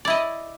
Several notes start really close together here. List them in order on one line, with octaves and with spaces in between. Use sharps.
D5 E4 D#5